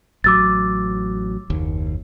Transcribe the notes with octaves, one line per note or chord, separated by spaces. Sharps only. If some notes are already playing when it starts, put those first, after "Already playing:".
A1 F#3 D6 E6 A6
F#1 D#2